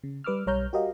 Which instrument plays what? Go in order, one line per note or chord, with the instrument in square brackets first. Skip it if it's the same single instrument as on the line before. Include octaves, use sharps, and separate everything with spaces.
[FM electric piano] C#3
G3 B4 D6 E6 F6
B1 G3 C#5 A#5 F6 G6
F#4 G4 A#4 D#5 F5